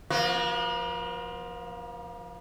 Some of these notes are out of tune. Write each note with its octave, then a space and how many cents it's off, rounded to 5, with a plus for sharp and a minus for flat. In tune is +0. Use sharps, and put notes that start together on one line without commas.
F3 +0 A#3 +45 F#4 +0